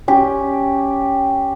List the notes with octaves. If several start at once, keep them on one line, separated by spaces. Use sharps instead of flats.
C#4 G4